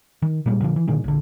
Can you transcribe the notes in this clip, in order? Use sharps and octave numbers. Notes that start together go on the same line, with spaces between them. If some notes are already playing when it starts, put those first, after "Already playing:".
D#3
A#2 G3 G#3
A#2 D3 E3 F3
E3
A#2 D3 D#3 G#3
A#1 D3